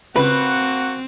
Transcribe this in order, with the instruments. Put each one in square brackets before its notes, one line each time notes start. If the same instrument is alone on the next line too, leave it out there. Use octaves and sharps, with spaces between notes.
[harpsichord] C#2 [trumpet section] A#3 F#4 F#5 [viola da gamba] C4 [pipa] B4